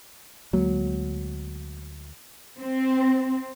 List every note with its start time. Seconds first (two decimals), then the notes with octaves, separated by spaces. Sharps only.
0.53 D2 F#3 G#3 A#3
2.60 C4